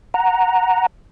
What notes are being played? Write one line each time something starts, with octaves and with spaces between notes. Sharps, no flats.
F#5 A#5